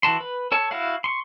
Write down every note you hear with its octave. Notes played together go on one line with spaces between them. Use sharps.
E3 F#4 A5 C6
B4
A4 C#5 A5
E4 F#4 F5 F#5
C6 C#6